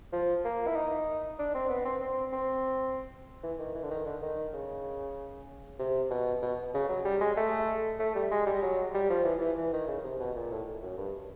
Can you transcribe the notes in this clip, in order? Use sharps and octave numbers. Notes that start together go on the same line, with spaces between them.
F3
A#3
E4
D#4
D4
C4
B3
C4
C4
C4
E3
D#3
E3
D3
D#3
D3
D#3
C#3
C3
B2
B2
C#3
F#3
G3
G#3
A3
A3
G3
G#3
G3
F#3
G3
F3
E3
E3
E3
D#3
C#3
C3
B2
A#2
A2
F#2
G2